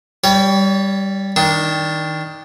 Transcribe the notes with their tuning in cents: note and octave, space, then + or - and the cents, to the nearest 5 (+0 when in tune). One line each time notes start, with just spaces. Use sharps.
G3 +0 C#5 +35
D#3 +15 D4 +0